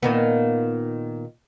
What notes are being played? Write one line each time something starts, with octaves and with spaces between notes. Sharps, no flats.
A#2 D#3 B3